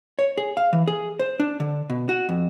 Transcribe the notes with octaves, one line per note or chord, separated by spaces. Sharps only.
C#5
G#4
F5
E3
G#4
C5
D4
D3
B2
F#4
F2